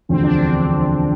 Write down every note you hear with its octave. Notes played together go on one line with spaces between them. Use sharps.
E1 D2 D3 F3 C4
D4
C4